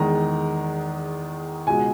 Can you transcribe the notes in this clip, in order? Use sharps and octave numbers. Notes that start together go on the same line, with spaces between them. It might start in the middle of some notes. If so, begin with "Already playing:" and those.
Already playing: E2 D#3 G#3 A#5
C#2 B2 G#3 G#5